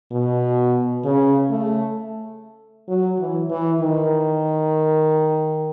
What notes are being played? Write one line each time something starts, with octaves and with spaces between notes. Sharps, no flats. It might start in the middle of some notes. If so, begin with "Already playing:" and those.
B2
C#3
A3
F#3
E3
E3
D#3